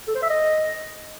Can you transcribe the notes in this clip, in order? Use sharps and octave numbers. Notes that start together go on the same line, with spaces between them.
A4
C5
E5
D#5